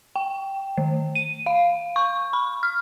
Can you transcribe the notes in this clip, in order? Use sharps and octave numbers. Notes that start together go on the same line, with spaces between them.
G5
D#3
D#7
F5
C#6
B5
F6